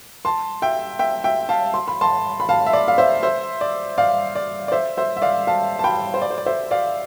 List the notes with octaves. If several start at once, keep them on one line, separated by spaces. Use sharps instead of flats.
A5 C6
E5 G5
E5 G5
E5 G5
F5 A5
C6
B5
A5 C6
B5
F5 A5
E5
D5
F5
C5 E5
C5 E5
D5
D5 F5
D5
D5
C5 E5
C5 E5
E5
D5 F5
F5 A5
A5
G5 B5
C5
D5
C5
D5
C5 E5
D5 F5